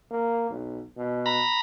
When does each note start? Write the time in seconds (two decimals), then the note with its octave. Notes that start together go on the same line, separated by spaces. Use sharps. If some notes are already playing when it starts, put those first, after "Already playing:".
0.11 A#3
0.49 B1
0.97 B2
1.26 A#5 B5